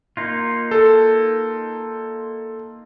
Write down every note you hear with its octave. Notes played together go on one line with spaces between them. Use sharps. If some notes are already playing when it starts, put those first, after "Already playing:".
A#3 D#4 F4
A4